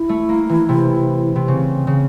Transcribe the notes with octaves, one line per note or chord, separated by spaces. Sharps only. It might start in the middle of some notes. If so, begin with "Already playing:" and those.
Already playing: E4
A3
A#3
E3
C3
C3
C#3 C4
C#3